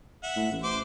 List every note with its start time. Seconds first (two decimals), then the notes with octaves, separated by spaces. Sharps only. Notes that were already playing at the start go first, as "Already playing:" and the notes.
0.23 E5 F#5
0.36 A2
0.52 A1
0.64 C5 D6